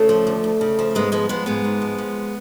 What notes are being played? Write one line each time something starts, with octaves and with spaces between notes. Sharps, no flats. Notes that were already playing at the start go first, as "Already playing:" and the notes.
Already playing: C#3 A3
F3
D2
D2
C#3
F3
G#2 G#3 B3
F3 G#3 B3
F3 G#3 B3
G#2 G#3 B3
G#2
F3
F3